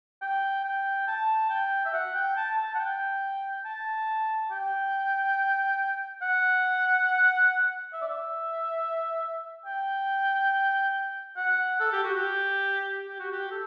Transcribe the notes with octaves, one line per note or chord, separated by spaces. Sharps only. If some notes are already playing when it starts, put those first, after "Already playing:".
G5
G5
A5
G5
E5
F#5
G5
A5
A5
F#5
G5
A5
G5
F#5
E5
D5
E5
G5
F#5
A4
G4
F#4
G4
G4
F#4
G4
A4